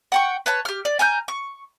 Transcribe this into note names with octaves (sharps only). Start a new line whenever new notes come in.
F#5 G5 C#6
B4 C#5 A5
G4 F6
D5
G#5 A#5 F6 G6
C#6